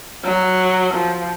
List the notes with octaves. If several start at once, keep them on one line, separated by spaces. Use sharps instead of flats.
F#3
F3